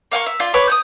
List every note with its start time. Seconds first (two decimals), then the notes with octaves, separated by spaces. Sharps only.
0.11 A#3 F5 F#5 C#6
0.26 E5
0.40 F4 D5
0.54 B4 C#5 D6
0.67 D#6 F#6 G6